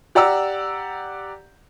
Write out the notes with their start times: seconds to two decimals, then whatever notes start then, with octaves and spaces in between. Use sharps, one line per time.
0.15 G4 D5 F#5 A#5 E6